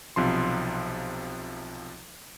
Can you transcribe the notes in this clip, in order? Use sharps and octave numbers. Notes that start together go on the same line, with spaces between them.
B1 C3 F3 C6